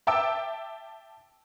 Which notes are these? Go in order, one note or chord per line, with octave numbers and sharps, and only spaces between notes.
E5 G5 A5 D6 E6 D7